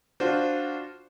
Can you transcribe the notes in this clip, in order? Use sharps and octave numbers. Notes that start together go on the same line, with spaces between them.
D4 F4 F#4 C5